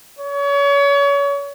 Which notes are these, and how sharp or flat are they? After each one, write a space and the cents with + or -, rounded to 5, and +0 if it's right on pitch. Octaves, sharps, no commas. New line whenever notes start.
C#5 +30